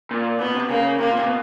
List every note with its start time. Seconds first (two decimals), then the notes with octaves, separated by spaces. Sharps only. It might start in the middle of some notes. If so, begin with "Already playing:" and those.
0.11 A#2
0.39 B2 B3
0.55 C3
0.69 C#3 A#3
0.99 C3 A#3
1.09 A#2
1.19 C3
1.27 B2